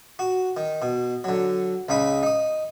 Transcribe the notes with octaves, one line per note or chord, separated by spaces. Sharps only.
F#4
D#3
B2
D3 F#3
C#2 C#3 D#4 B5
D#4 D#6